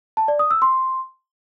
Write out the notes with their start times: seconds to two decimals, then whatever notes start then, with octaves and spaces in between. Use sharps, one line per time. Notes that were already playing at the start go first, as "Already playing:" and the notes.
0.17 A5
0.28 D5
0.39 D#6
0.51 E6
0.62 C6